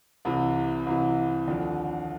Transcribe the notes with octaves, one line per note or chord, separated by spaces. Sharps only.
C2 C3 E3
C2 C3 E3
D#2 D3 F3